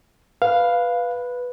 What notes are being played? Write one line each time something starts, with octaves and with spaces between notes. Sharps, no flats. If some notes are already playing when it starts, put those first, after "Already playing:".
B4 F5